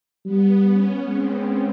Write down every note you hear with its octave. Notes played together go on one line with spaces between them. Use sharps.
G3 B3
C#4
G#3 C4